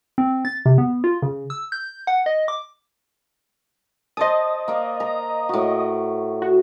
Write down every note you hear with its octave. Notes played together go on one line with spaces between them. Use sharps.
C4
A6
C3
B3
F4
C#3
E6
G6
F#5
D#5
D6
C5 D5 D#5 A5 D#6
A#3 D5
A#5
A2 F#4
F#4